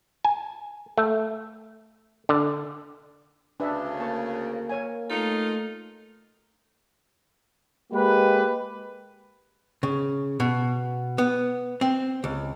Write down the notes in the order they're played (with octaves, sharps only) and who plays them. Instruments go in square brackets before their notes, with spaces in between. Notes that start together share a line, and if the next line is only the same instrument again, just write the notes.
[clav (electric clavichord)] G#5
A3
D3
[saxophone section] D2 C#3 [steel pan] D4 B4 E5
[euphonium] A#3 [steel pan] A5 C#6
[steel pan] A#4 C#5 G#5
[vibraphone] A3 A4 [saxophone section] D#4 F4
[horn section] G#3 A#3 G4 B4
[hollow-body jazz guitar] C#3
B2
B3
C4
C#2